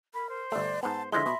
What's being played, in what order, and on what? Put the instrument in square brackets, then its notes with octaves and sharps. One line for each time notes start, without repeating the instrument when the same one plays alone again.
[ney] A#4 [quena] B5
[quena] C5
[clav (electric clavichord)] G1 A3 [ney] D5
[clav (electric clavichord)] G#2 B3 [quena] C5 [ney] A5
[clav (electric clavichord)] D3 F3 G#3 [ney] E4 [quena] E5 [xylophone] C6 A#6
[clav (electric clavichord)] B2 [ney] B5